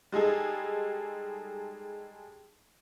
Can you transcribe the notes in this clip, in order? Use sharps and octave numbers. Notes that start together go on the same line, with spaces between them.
G3 G#3 D#4 G#4 A4